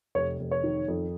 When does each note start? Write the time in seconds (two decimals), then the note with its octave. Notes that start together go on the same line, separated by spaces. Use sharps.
0.15 F1 C#5
0.39 F1
0.51 C#5
0.63 D#3
0.88 F2